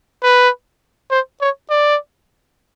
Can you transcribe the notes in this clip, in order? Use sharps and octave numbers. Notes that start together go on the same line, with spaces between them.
B4
C5
C#5
D5